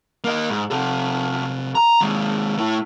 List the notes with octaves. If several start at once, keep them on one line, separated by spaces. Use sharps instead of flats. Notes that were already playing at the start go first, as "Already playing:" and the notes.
A#3 D#5
G#2
C3 A4
A#5
D#2 G#3
A3 E4